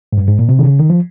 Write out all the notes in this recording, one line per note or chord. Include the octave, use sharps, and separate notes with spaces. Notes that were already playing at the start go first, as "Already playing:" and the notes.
G#2
G2
G#2
A#2
C3
D#3
C#3
D#3
F3